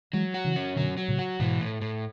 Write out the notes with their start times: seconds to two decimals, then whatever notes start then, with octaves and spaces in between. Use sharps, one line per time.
0.13 E3 F#3 G#3
0.34 F#4
0.44 C#3 E3
0.56 C#4
0.76 B2 D3 F#3
0.97 F#3
1.08 A2 C#3
1.19 F#4
1.39 G#2 B2 E3
1.61 A2
1.81 A2